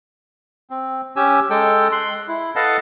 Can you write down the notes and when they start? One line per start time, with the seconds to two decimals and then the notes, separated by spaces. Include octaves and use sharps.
0.70 C4
1.16 C#4 G4 G#5 E6
1.50 G#3 A4 G5
1.92 C6 F#6
2.28 E4
2.56 A4 B4 D#5 F5 F#5 A5